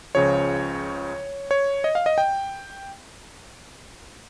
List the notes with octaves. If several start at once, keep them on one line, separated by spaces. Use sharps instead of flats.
C#2 C#3 F3 C#5
C#5
D#5
F5
D#5
G5